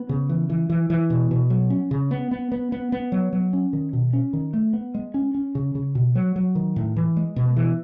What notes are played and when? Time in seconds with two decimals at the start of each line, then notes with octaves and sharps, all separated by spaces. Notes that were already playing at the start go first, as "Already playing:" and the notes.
Already playing: B3
0.09 C#3
0.29 E3
0.50 E3
0.70 E3
0.90 E3
1.10 B2
1.31 B2
1.50 F#3
1.70 C#4
1.91 C#3
2.11 B3
2.31 B3
2.52 B3
2.72 B3
2.92 B3
3.12 F#3
3.33 F#3
3.53 C#4
3.73 D#3
3.93 B2
4.13 C#4
4.33 D#3
4.53 A3
4.73 B3
4.94 G#3
5.14 C#4
5.35 C#4
5.55 C#3
5.75 C#3
5.95 B2
6.15 F#3
6.36 F#3
6.55 D#3
6.76 A2
6.96 E3
7.17 G#3
7.36 B2
7.57 E3